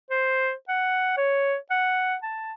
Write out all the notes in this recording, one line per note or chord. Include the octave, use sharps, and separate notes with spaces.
C5
F#5
C#5
F#5
A5